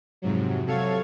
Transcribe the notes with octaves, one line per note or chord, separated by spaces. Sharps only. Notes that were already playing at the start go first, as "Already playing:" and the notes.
F2 G#2 C3 F#3
C3 F#3 A4 C#5 F5 G#6